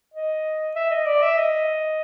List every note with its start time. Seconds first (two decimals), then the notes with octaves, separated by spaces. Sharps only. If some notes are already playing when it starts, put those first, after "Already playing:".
0.14 D#5
0.76 E5
0.91 D#5
1.06 D5
1.22 E5
1.37 D#5